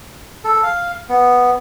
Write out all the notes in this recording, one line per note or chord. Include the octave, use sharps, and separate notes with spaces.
A4
F5
B3